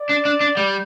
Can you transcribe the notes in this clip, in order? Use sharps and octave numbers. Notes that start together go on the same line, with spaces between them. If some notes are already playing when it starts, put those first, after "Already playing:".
Already playing: D5
D4
D4
D4
G3